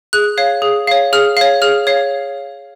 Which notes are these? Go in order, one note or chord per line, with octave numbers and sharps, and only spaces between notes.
G#4 F#6
C#5 F5
G#4
C#5 F5
G#4 F6
C#5 F5
G#4 F6
C#5 F5